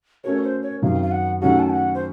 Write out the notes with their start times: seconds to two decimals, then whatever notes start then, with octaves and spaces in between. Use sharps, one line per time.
0.24 A3 C#4 F#4 A#4 C#5
0.44 C5
0.63 C#5
0.82 F#2 D#3 F#3 C4 F5
1.02 F5
1.11 F#5
1.41 D#3 F#3 A3 C#4 F#4 F#5
1.59 A5
1.70 F#5
1.95 C5